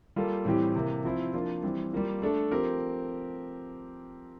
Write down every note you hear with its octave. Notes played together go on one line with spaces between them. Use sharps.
G3 A#3 F4 A4
A2 E3 G3 C4 G4
C3 E3 A#3
F3 C4 E4
F3 A#3 D4 F4
E3 G3 C4
G3 A#3 F4
A3 D4 A4
F3 C4 G4 A#4